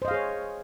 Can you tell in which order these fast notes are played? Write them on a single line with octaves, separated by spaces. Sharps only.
C5 D#5 F5 G#4 C#5